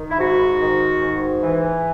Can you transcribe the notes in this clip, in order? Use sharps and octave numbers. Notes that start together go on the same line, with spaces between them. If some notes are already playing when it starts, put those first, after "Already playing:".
Already playing: D#3
E4
G#2 F#4
D#3
G#2
E3